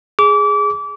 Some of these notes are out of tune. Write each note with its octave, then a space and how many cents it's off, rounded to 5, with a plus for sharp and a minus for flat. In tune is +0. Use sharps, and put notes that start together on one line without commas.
G#4 +0 D6 -30